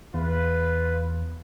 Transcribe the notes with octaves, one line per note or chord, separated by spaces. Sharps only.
E2 F4 B4